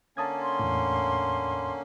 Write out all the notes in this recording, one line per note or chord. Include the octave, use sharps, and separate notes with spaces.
D3 A#3 C#4 A5 D#6 G#6
C6
E2 A2